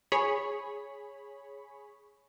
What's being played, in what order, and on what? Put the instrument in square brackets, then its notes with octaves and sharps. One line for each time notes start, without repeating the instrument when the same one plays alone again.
[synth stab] G#4 C#5 B5